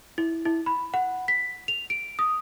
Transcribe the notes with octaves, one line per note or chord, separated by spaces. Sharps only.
E4
E4
B5
F#5
B6
F7
D7
D#6